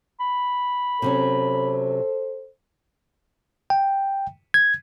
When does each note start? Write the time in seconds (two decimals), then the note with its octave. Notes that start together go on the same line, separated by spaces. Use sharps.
0.20 B5
1.02 C3 F#3 C#4 A4 C5
3.70 G5
4.54 G#6